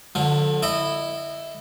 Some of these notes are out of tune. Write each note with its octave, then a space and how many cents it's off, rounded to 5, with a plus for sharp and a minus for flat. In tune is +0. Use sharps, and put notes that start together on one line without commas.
D3 +0 F3 +45
E4 +0 D#5 -25